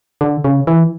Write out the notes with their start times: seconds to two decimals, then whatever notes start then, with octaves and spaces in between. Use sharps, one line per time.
0.21 D3
0.44 C#3
0.67 E3